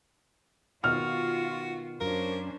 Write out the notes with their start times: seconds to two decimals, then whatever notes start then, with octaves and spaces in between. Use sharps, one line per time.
0.84 B2 D#3 B3 F4 F#4 F6
2.00 F#2 C#4 D4 A#4 C5 F5